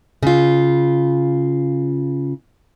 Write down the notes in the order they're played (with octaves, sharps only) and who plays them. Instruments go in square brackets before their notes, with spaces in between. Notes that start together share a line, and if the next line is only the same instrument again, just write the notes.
[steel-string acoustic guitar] C#3 F4